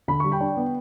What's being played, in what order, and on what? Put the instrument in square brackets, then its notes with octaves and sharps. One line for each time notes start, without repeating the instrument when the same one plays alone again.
[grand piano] D3 B5
G3 C#6
G5 B5
D4
B3